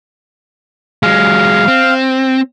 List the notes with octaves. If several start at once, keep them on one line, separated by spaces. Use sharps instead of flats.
F#3 G#3 F5
C4